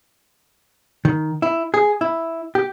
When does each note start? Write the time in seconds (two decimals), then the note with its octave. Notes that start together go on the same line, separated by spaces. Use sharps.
1.05 D#3
1.42 E4
1.74 G#4
2.01 E4
2.55 G4